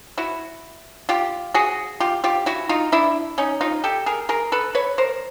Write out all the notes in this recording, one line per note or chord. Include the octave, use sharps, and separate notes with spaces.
E4 F#4
F4 G4
F#4 G#4
F4 G4
F4 G4
E4 F#4
D#4 F4
D4 E4
C#4 D#4
D#4 F4
G4 A4
G#4 A#4
G#4 A#4
A4 B4
B4 C#5
A#4 C5